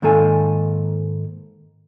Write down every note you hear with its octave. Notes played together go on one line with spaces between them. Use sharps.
G#2 D#3 A#3 A4 G#5